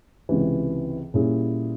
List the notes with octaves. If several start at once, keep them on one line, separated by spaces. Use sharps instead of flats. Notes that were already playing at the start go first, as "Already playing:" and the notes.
C#2 C3 E3
A#2 G3 C#4 E4 G#4